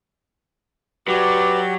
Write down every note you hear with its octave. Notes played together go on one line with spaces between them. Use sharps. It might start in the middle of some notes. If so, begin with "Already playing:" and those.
F#3 G4 B4 D5 F#5